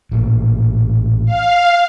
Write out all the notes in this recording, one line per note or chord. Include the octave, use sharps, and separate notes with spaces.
A1 A#2
F5